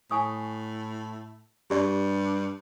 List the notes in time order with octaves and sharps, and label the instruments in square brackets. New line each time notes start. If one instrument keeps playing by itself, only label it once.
[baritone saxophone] A2 [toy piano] G#5 C#6 D#6
[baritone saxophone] G2 [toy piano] G4 D5